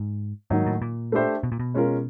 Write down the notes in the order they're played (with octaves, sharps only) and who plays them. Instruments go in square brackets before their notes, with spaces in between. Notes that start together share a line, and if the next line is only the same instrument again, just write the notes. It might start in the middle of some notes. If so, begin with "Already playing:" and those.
Already playing: [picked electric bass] G#2
[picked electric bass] G#2 [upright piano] D#3 F#3 A#3 D#4
[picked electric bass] A2
A#2
[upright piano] A3 D4 G4 C5 E5
[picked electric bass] B2
A#2
B2
[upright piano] G#3 C#4 F4 A#4